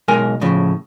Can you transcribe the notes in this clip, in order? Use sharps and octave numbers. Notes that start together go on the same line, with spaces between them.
B1 G#3 A#4 G#5
A2 C#3 F3